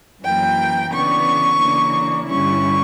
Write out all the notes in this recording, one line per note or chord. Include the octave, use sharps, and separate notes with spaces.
F#2 E3 A#3 G5
C#3 E3 B3 D4 C#6
C#3 E3 A#3 D4
G2 D3 G3 C#4 E4 C#6